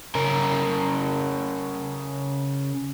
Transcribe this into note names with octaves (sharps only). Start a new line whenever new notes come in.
C#3 A#4